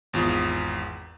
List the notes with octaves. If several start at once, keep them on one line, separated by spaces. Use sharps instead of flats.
G#1 E2 F4 D#6